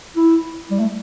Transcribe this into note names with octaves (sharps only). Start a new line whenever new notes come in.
E4
G3
A3